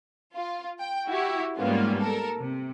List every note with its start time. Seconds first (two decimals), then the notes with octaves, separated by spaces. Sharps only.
0.35 F4
0.80 G5
1.09 E4 F#4 G4
1.57 G#2 G3 A#3 B3 C#4 F4
2.00 A4 A#4
2.40 C3